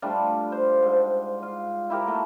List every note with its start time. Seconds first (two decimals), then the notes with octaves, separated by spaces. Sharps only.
0.02 G3 A3 D4 F4
0.52 C5
0.83 G#2
1.43 F4
1.90 E4 G4 A#4
2.06 A3 A#3 F#4